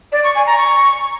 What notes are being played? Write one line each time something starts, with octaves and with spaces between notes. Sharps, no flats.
D5
C#6
G#5
A#5
C#6